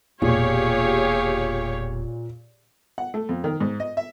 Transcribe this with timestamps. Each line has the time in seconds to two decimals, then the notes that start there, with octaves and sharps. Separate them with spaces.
0.22 E1 A#2 A#3 G4 G#4 C#5 F5
2.98 F#5
3.14 A3
3.29 F2
3.44 D#3
3.60 G#2
3.80 D#5
3.97 E5